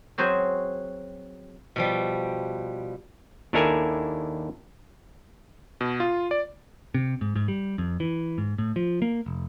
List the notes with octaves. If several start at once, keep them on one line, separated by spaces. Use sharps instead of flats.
F#3 C4 F#4 G#4 C5
B2 F3 G3
D#2 D4 E4 A4 A#4 G#5
B2
F4
D5
C3
G#2
G#2
G3
F2
E3
G#2
A2
F3
A#3
F1